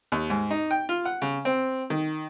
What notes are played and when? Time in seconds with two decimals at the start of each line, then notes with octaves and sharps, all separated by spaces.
0.12 D#2
0.30 G#2
0.51 D#4
0.71 G5
0.89 F4
1.05 F#5
1.22 C#3
1.45 C4
1.90 D#3